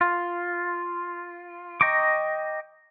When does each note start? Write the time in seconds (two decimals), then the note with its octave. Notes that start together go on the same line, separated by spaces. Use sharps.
0.01 F4
1.81 D#5 G5 A#5 C#6 D6